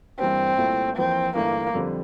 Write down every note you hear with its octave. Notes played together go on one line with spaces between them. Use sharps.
G2 E3 G3 A#3 C4
C2 A#2 A3 E4
F2 E3 A#3 C4
G1 G2 E3 A3 A#3 E4
F2 D3 G3 C4